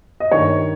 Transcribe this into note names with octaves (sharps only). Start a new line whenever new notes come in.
D#5
G2 D#3 A#3 C#5